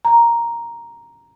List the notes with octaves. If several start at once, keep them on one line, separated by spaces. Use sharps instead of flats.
A#5